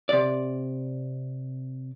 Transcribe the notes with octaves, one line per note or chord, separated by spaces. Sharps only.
C3 D5